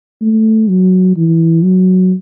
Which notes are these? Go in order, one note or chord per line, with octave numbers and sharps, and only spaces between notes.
A3
F#3
E3
F#3